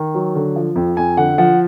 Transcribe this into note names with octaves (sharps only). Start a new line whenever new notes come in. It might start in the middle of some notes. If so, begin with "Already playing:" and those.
Already playing: D#3
F#3
D3
F3
F2
F2 G#5
D3 F#5
F3 F#5